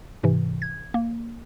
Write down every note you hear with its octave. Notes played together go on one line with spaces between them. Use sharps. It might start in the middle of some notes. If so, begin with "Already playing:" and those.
G#2 C3 E3
G#6
A#3